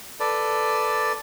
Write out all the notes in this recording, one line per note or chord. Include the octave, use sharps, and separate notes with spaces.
A4 B4 D5